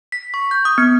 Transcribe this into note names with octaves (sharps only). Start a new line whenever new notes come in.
B6
C#6
G6
D#6
B3